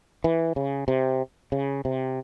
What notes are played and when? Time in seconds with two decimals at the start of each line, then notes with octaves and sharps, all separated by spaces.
0.24 E3
0.56 C#3
0.88 C3
1.52 C#3
1.85 C3